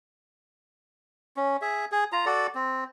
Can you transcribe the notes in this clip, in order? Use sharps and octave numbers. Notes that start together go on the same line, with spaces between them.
C#4
G#4 E5
G#4
F4 A#5
F#4 A4 D5
C4